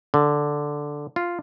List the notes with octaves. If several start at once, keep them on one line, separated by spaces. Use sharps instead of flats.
D3
F4